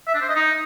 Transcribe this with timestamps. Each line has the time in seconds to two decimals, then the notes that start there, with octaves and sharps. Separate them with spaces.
0.07 E5
0.15 D4
0.22 C5
0.29 D#5
0.36 D#4